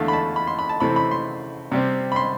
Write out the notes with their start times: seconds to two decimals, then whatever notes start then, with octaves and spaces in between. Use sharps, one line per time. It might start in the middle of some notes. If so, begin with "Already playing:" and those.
Already playing: E2 D3 A3 F5
0.08 B5
0.13 A5
0.36 B5
0.47 C6
0.59 B5
0.69 A5
0.80 C3 E3 A3 C4 B5
0.96 B5
1.11 C6
1.72 C3 G3 C4
2.12 B5
2.16 C6